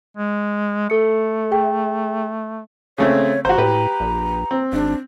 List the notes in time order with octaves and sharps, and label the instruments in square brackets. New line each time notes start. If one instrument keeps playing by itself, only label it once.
[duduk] G#3
[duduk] A3 [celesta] A4 C#7
[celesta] G#4 E5 G5
[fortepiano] C#3 A3 C4 [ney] C#5
[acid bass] G#1 [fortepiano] F#4 C5 [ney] A#5
[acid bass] A2 [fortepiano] G4 B4
[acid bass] A#1
[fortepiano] C4
[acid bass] G#1 [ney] D4